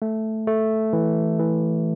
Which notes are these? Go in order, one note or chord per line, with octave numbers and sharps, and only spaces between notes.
A3
A3
E3
E3